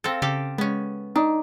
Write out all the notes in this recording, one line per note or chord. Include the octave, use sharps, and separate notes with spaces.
C4 A4 F5 A#6
C#3 G4 A4 F5
G#3 B3 C#4
D4 D#4